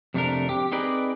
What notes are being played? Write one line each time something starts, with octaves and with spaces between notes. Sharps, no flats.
F2 C3 A3 A#3 D4 A#4
C4 G4
C4 D#4 G#4 A#4 B4 D5